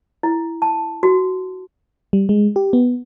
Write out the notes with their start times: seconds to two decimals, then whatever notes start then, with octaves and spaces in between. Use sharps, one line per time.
0.23 E4
0.62 A5
1.03 F#4
2.13 G3
2.29 G#3
2.56 G4
2.73 B3